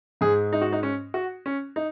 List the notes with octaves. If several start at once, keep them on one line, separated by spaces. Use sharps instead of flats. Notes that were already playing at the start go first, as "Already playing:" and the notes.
G#2 G#3 G#4
D#4
F#4
D#4
C#4
F#4
C#4
D#4